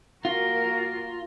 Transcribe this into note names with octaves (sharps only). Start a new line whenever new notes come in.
A#3 F4 F#4 A#4